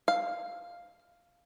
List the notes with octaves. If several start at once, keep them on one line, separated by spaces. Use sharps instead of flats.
F5